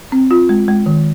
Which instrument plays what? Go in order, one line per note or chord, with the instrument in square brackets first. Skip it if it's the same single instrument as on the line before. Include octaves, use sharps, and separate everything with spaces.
[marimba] C4
F4
G#3
G#3
D#3